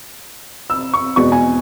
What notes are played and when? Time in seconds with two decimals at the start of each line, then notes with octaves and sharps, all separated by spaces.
0.70 E6
0.94 C#6
1.16 E2 B2 G#3 C#6
1.32 G#5